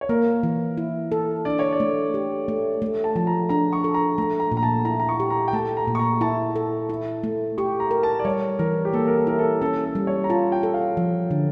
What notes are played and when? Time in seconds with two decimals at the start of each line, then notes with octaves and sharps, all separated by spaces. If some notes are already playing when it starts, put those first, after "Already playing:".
0.01 C#5
0.09 A#3 A#4
0.43 E3
0.78 E4
1.12 A4
1.45 D4 D5
1.59 C#5
1.73 D5
1.80 A3
2.14 G4
2.48 A3
2.82 A3
3.04 A5
3.16 F3 A5
3.27 A#5
3.49 D4 A#5
3.73 C#6
3.84 A4
3.94 A#5
4.18 A3 A#5
4.40 A#5
4.51 A#2
4.57 A#5
4.63 A5
4.85 E4 A#5
5.00 A#5
5.09 C#6
5.20 G4
5.30 A#5
5.48 G5
5.53 A3 A5
5.77 A#5
5.88 A#2
5.95 C#6
5.99 A#5
6.21 E4 A5
6.56 A4
6.90 E4
7.24 A3
7.58 G4 C#6
7.80 A#5
7.91 A#4
8.03 A5
8.19 D5
8.25 G3 C#5
8.59 E3 A#4
8.85 G4
8.93 A#3 A4
9.07 A#4
9.16 A4
9.27 E4 A#4
9.39 A4
9.62 C#4 A4
9.84 A4
9.95 G3
10.07 C#5
10.24 A#5
10.30 F4 A5
10.52 G5
10.63 A4
10.74 F5
10.97 F3
11.31 D3